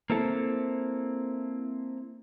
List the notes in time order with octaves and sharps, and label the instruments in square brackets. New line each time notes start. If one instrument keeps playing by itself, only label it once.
[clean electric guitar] A#3 C4 E4 A4